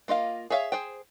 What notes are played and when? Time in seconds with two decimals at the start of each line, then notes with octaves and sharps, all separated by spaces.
0.08 A#3 F4 D#5 F5
0.50 G#4 C#5 E5 F5
0.72 G#4 C5 G5